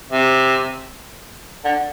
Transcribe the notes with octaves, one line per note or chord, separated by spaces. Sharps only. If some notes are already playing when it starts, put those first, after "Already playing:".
C3
D3